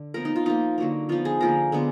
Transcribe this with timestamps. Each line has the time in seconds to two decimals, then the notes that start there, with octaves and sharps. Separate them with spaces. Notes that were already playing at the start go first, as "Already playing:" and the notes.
Already playing: D3
0.14 F3 B3 A#4
0.25 D#4
0.36 F4
0.46 F3 A#3 D#4
0.78 D3 F#3 A#3
1.09 F3 B3 F4
1.25 G#4
1.41 D3 F3 A#3 A#4
1.72 D3 G#3 B3